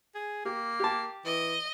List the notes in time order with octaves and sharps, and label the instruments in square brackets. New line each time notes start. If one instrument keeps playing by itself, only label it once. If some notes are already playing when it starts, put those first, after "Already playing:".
[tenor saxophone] G#4
[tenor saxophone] A#3 [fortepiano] G4
[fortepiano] G4 A5
[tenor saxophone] E3 [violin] D#5